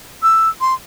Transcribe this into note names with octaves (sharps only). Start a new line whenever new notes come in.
E6
C6